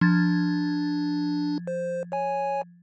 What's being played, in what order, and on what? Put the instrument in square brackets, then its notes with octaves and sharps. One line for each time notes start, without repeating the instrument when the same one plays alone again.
[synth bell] F3 G#6 A6 [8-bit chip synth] D4
[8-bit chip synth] C5
C#5 G#5